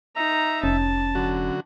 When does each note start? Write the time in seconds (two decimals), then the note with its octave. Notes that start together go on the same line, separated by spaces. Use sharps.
0.16 D#4 E5 A#5
0.63 F1 C#4 A5
1.15 D3 F#3 F#4